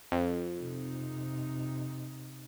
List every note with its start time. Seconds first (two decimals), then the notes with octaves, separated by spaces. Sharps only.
0.12 F2
0.59 C3 D#4